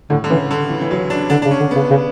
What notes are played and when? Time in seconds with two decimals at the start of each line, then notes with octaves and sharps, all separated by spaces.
0.10 A2 D3
0.24 D3
0.30 C#3 E3
0.51 D3
0.70 E3
0.81 E3
0.91 F#3
1.10 D4
1.30 D3 D4
1.42 C#3 D4
1.51 C#4
1.60 D3
1.71 C#3 B3
1.90 C#3